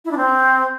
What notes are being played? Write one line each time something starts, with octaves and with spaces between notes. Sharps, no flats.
E4
D4
C4